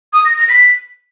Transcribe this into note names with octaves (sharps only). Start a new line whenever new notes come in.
D#6
A#6
A#6
B6